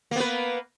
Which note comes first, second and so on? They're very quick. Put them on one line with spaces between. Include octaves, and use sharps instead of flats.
A#3 B3 B4